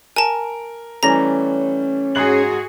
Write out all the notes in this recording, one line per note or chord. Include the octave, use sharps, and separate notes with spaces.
A#4 G#5 A5
E3 G3 A3 C#4 A#5 A#6
G#2 F#4 G#4 F#6 F#7